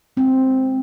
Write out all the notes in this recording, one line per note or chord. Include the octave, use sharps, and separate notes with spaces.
G#3 C4